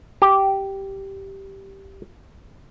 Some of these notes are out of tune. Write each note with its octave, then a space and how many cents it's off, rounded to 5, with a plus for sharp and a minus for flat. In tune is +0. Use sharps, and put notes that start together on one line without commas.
G4 -5